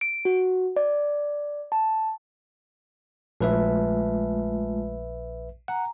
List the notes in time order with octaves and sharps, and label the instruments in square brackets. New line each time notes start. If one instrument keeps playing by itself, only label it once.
[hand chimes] D7
F#4
D5
A5
[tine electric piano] A#1 B4 E5 [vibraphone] G#3 A3 F4
[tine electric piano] F#5 [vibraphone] G#5 A#5